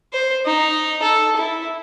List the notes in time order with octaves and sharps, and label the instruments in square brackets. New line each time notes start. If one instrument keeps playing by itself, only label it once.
[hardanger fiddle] C5
D#4
A4
E4